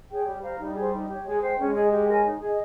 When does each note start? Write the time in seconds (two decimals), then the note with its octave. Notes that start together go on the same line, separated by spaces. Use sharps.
0.09 G#4 C#5 G5
0.26 G3 G4
0.42 C5 F5 A#5
0.59 G3 D#4
0.76 G#4 C5
0.92 D#4
1.08 G4 C#5
1.25 G#3 G#4
1.41 C5 G5
1.58 G#3 C#4
1.75 G#4 D#5
1.91 G4
2.08 A#4 C#5 G#5
2.25 D#4
2.41 G#4 D#5